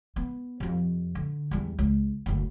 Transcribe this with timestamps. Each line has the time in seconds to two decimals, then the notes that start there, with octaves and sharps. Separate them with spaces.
0.16 B3
0.60 F2 C3
1.15 D3
1.51 E2 G3
1.79 C#2
2.26 F#1 D2